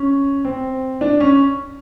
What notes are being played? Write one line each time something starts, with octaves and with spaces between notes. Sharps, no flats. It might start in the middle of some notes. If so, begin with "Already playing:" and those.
Already playing: C#4
C4
D4
C#4